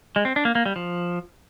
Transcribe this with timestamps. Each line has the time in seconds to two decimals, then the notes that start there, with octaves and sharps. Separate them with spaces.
0.16 G#3
0.25 C4
0.36 D4
0.45 A#3
0.55 A#3
0.66 G3
0.76 F3